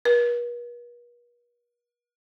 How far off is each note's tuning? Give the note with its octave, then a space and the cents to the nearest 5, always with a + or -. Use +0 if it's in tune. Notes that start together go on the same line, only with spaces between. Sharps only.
B4 -45